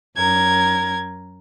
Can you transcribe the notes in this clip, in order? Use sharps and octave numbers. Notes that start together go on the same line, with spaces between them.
F#2 A#4 G#6